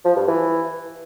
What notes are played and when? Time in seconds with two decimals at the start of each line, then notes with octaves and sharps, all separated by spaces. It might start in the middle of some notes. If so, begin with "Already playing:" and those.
0.05 F3
0.16 G2
0.28 E3